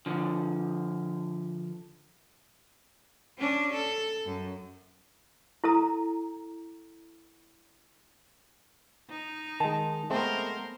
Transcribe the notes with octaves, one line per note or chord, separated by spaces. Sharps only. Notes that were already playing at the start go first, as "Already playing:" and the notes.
D3 F3
C#4 D4
A4
F#2
E4 A4 A#5
D#4
D#3 G#3 A5
G#3 A3 B3 C4 A#4 C5